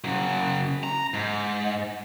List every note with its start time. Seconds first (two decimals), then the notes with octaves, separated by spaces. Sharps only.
0.04 C#3 F#3
0.84 A#5
1.14 G#2